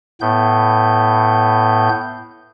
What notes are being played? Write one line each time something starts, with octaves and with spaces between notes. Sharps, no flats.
A2 B3 G6